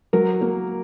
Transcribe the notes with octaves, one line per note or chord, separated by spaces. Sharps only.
F#3 A#4
A#3